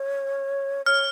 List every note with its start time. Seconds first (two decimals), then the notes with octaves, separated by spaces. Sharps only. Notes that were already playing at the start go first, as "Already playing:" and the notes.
Already playing: C#5
0.86 C#5 F6